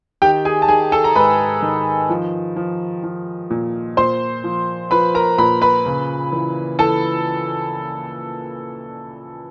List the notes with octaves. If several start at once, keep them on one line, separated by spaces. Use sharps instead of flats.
D#3 G4 G5
G#4 G#5
A5
D#3 G#4 G#5
A4 A5
A#5
G#2 B4 B5
D#3
F3
F3
F3
A#2
A#2 C5 C6
F3
F3 B4 B5
A#4 A#5
A#2 B4 B5
B4 B5
C#3
E3
E3 A4 A5